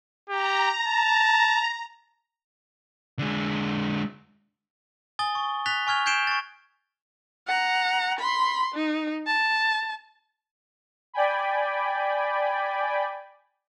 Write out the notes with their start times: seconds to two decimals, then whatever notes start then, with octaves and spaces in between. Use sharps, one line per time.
0.30 G4 A#5
0.87 A5
3.19 D3 G#3
5.19 G#5 D#6 A6 G7
5.35 C#6
5.66 F#6 A6 B6 F7 G7
5.87 G#5 C#6 F6 G#6 F7
6.06 G6 G#6 C7 D7 E7 G7
6.27 C#6 A6
7.48 F#5 A#5
8.19 B5 C6
8.74 D#4
9.27 A5
11.14 D5 G5 G#5 B5